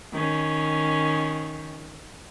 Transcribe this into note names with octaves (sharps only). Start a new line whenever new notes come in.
D#3 C#4